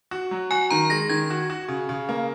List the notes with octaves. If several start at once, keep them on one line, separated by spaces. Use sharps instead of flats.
F#4
F#3
F#4 G#5
D#3 A#5
G#3 A#6
D#3 G#6
F#4
F#4
C#3
C#3
A#3